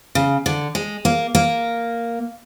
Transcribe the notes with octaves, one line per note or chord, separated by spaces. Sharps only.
C#3
D3
G#3
A#3
A#3